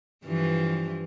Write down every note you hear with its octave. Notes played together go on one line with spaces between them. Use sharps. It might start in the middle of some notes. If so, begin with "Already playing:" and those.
G2 E3 F3